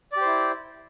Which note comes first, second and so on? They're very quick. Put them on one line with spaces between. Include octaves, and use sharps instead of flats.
D5 G4 C5 E4